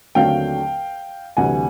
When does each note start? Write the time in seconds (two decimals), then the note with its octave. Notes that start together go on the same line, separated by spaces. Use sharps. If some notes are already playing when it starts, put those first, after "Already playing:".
0.15 D#2 D3 F#3 A3 C4 F5 G5
1.37 D2 C3 E3 G3 F#5 G#5